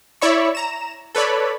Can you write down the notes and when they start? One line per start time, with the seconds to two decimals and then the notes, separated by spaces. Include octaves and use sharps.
0.21 E4 C#5 D5 E5 B5 C#6
0.55 A#5 E7
1.15 A4 B4 C#5 D5 B5